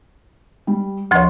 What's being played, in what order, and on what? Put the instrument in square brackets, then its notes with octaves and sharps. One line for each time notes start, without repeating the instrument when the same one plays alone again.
[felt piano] G3
[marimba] D2 F3 [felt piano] C#5 C6